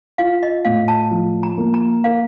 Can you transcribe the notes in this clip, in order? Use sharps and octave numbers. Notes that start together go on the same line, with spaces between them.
F4 F5
D#5
A2 F5
A5
F3
A#5
A#3
A#5
A#4 F5